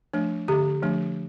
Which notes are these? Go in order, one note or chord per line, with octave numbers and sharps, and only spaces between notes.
F3 A3 D4
D3 G4
F3 A3 D4